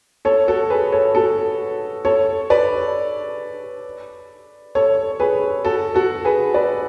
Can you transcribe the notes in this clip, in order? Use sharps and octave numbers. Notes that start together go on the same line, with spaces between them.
A4 C#5
F#4 A4
G#4 B4
A4 C#5
F#4 A4
A4 C#5
B4 D5
A4 C#5
G#4 B4
F#4 A4
F#4 A4
G#4 B4
B4 D5